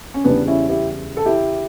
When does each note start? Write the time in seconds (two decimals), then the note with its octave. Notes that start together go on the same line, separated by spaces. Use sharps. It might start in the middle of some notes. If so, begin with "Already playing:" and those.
0.14 C#4
0.24 E2 C#3 E3 G3 B3 D4
0.47 C#4 E4
0.69 E4 G4
1.17 A4
1.26 E4 G4